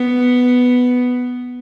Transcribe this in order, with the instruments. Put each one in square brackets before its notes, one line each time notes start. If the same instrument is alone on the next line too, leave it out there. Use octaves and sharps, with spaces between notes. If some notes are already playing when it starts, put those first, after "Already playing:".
Already playing: [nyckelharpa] B3